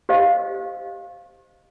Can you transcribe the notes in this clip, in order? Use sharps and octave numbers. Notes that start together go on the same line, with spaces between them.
G4 C5 D#5 F5